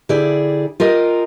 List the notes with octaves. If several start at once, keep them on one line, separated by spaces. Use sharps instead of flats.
D3 E4 G4 G#4 D5
F4 G4 A#4 D#5